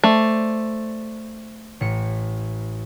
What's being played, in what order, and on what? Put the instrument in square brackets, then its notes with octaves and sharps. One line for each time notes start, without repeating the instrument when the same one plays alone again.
[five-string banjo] A3 [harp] C5 D5
[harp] A1 C#7